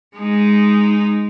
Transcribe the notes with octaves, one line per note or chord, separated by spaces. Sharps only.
G#3 D#4